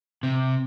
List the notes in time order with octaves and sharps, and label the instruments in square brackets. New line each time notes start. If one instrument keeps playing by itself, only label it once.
[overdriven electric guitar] C3